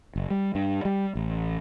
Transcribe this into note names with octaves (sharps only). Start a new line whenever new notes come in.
F#1
G3
G2
G3
A1